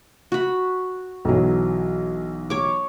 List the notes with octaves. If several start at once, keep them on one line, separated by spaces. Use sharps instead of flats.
F#4 B5
B1 E3 F#3
C#5 D6